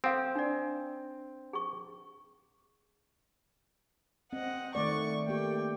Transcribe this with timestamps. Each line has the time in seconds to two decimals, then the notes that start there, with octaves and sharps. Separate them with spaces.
0.04 C4 A4 F5
0.35 D4 D5
1.53 G#4 C#6
4.33 C4 D#5 F#5
4.75 D#3 A3 D5 C#6
5.28 A#3 G4 G5